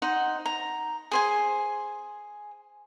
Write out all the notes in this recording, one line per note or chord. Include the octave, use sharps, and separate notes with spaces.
D#4 C5 F#5
A#5
G#4 C5 G#5